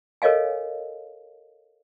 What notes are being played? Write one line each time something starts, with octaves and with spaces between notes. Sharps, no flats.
A4 A#4 C#5 D#5 F5 G#5